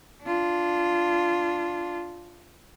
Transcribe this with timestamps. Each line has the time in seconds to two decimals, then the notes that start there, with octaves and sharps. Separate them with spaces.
0.23 D4 F4